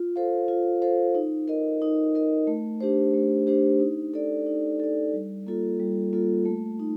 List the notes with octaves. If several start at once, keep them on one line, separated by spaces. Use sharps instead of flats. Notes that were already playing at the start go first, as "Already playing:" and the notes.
Already playing: F4
A4 C5 F5
F4
A4 C5 F5
D#4
A#4 D#5
D#4
A#4 D#5
A3
D4 G4 C5
A3
D4 G4 C5
D#4
A4 D5
D#4
A4 D5
G3
A#3 F4 A4
G3
A#3 F4 A4
A3
D#4